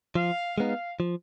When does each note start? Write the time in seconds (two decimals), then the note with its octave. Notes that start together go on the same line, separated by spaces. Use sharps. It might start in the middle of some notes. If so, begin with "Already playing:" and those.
0.15 F3 F5
0.58 G#3 B3 D#4 F5
1.00 F3